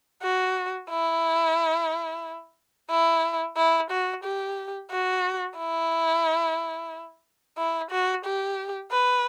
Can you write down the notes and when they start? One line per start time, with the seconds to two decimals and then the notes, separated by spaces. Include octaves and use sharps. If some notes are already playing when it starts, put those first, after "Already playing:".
0.23 F#4
0.89 E4
2.90 E4
3.57 E4
3.91 F#4
4.24 G4
4.90 F#4
5.57 E4
7.58 E4
7.91 F#4
8.25 G4
8.92 B4